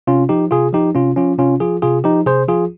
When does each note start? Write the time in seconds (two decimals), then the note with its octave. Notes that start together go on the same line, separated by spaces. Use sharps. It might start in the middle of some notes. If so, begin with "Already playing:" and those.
0.07 C3 C#4 F4
0.29 F3 D#4 G4
0.51 C3 F4 G#4
0.73 F3 D#4 G4
0.95 C3 C#4 F4
1.17 F3 C#4 F4
1.38 C3 C#4 F4
1.60 F3 F4 G#4
1.82 C3 F4 G#4
2.04 F3 D#4 G4
2.26 C3 G#4 C5
2.48 F3 F4 G#4